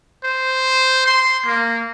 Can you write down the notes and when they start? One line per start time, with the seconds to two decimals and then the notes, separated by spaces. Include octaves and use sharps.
0.24 C5
1.06 C6
1.46 A#3